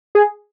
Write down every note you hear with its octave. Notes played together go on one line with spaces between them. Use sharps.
G#4